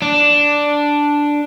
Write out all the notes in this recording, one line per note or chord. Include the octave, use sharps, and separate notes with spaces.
D4